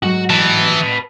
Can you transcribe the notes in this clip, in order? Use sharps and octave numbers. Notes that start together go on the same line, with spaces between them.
G#2 F#3 A3 F#4
E3 B4 A5